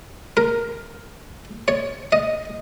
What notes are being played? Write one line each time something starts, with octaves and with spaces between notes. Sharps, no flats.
A#4
C#5
D#5